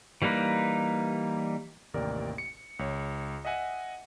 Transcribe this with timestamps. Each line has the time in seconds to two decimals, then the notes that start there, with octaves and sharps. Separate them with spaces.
0.22 E3 G3 A#3 D#4 B4
1.94 A1 D#2 C3 A#4 D5
2.38 C#7
2.79 C#2 C#5
3.45 D#5 E5 F#5 G#5